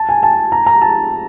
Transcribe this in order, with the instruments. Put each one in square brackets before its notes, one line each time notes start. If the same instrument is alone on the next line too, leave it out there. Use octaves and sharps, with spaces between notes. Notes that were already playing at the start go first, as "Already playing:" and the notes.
Already playing: [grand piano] A5
G#5
A5
A#5
A#5
A5